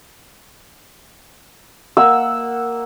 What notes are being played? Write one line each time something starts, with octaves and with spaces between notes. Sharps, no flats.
A#3 F#5 E6